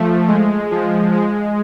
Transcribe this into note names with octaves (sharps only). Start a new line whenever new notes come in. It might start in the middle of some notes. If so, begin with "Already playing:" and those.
Already playing: F3 A3
G#3
F3
G#3